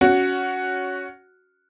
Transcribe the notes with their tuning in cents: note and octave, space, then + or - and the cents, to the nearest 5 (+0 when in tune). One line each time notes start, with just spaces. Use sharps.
C#4 +15 F#4 +0